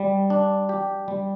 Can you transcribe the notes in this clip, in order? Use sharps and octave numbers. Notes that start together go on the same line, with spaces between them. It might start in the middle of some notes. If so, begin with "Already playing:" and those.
Already playing: G3
D4
G4
G3